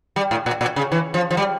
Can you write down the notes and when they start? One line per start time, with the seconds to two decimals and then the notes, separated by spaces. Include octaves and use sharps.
0.16 G3
0.31 A2
0.46 A#2
0.61 A#2
0.76 C#3
0.92 E3
1.14 F3
1.31 F3
1.37 G3